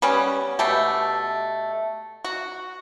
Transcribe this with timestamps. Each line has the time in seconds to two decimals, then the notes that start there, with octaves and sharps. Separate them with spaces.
0.02 G3 B3 C#4
0.59 B2 A3 G4
2.25 F#4